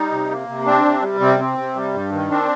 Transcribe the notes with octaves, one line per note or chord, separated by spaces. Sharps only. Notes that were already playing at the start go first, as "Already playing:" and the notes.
Already playing: G3 D#4
C3
A#3
C3
C4 D4
C3
G3
C3 C4
C4
C3
G3
G2
D#3
C4 D4